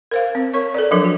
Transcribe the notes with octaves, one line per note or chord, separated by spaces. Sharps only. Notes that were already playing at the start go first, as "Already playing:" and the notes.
A#4 C5 F5
C4
A#4 C#5 C#6
A4 B4 D5
F3 F#3 D4 A4 A#4 C#5
F#4